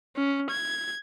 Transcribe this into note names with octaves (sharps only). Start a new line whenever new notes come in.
C#4
G#6